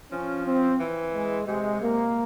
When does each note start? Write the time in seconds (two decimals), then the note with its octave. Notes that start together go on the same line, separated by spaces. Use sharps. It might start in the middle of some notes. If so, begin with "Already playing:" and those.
0.12 F3 C#4
0.46 C4
0.79 E3
1.14 G#3
1.47 C3 G#3
1.82 A#3